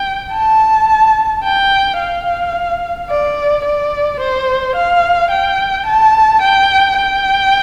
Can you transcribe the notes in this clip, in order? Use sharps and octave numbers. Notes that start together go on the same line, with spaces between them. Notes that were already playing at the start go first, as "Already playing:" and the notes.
Already playing: G5
A5
G5
F5
D5
D5
C5
F5
G5
A5
G5
G5